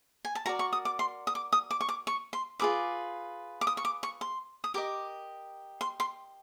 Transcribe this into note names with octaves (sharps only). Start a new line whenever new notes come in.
G#5
A5
F#4 A#4 D5 A#5
C#6
D#6
D6
C6
D#6
D6
D#6
D6
C#6
D6
C#6
C6
F4 G#4 B4 D6
D6
D#6
C#6
D6
C#6
C6
D#6
G4 A#4 D#5 D6
C6
C6